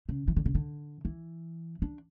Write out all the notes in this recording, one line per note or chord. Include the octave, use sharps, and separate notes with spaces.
C#3
E3
D3
C#3
D3
E3
D4